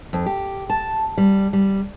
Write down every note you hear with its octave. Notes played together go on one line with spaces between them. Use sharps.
F2
G4
A5
G3
G3